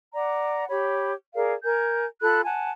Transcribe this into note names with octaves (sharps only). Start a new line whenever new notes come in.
D5 F#5 A#5
G4 C#5 B5
G#4 A#4 D5 F5
A#4 G#5 G6
F4 A4 B5 F#6
F#5 G#5 A5